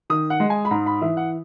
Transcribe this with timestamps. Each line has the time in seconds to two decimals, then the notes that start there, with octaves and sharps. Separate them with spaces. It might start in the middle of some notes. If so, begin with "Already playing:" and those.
0.10 D#3 D#6
0.30 F#5
0.40 G#3
0.50 G#5
0.65 B5
0.71 G#2 A#5
0.86 B5
1.01 E3 E5
1.17 F#5